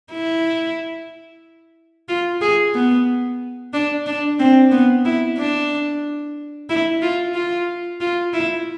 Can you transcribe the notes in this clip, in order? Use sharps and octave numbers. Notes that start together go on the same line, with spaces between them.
E4
F4
G#4
B3
D4
D4
C4
B3
E4
D4
E4
F4
F4
F4
E4